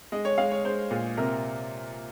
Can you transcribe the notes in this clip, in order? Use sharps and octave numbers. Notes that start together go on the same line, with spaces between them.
G#3 D#5
C#5
G#3 F5
C#5
G#3 C5
A#2 G#4
C3 A#4